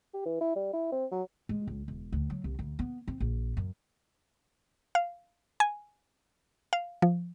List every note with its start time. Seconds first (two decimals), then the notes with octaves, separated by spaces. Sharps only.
0.14 G4
0.26 E3
0.41 E4
0.56 G3
0.73 E4
0.92 C4
1.12 F#3
1.49 G#3
1.68 C#2
1.88 E1
2.12 D2
2.30 F#3
2.44 C2
2.59 D2
2.79 B3
3.08 C4
3.20 A#1
3.57 F#2
4.95 F5
5.60 G#5
6.73 F5
7.02 F3